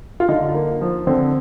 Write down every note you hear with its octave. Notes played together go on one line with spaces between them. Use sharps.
F4
D3 D#4
A#3
F3
D3 C4